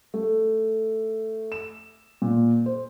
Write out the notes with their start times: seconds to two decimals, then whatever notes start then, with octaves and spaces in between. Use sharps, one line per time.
0.14 A3
1.52 E7
2.22 A#2
2.66 C5